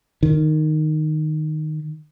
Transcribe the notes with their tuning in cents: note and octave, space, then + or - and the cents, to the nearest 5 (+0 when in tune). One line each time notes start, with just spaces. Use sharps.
D#3 -10